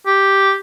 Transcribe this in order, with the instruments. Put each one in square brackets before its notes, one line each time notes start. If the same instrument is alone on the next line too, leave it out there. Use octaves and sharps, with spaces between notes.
[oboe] G4